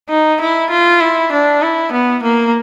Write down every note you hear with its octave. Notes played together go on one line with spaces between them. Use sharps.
D#4
E4
F4
E4
D4
E4
B3
A#3